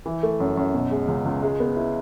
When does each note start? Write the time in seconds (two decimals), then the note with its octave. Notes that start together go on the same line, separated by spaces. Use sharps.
0.06 E3
0.23 A3
0.40 F#2
0.57 F#2
0.74 B2
0.91 G#3
1.08 C#2
1.25 C#2
1.42 G#3
1.60 B3
1.77 E4